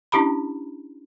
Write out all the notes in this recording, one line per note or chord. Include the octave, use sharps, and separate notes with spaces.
C#4 D4 E4 G4 A#5 B5